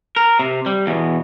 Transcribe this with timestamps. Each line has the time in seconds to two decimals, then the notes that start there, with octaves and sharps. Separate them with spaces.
0.16 A#4
0.39 C3
0.66 G3
0.87 E2 B2